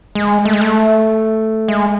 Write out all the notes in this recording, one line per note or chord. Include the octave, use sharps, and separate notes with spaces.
G#3
A3
G#3
A3
G#3